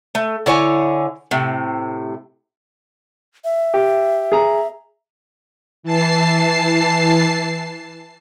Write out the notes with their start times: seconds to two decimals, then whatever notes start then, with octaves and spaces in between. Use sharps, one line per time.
0.15 A3
0.46 D3 E4 C#5 G#5
1.31 A2 C3
3.45 E5
3.74 G4
4.32 G#4 A#5
5.83 E3 A5 C7